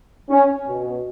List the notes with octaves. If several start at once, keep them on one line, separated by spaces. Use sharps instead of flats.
C#4
B2